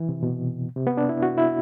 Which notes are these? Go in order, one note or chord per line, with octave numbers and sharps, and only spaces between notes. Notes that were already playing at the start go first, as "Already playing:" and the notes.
Already playing: E3
C3
B2
C3
B3
D4
E4
F#4
E4